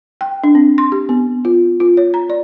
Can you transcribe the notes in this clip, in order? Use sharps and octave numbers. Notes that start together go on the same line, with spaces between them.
G5
D4
C4
C6
G4
B3
F4
F4
C#5
A#5
D5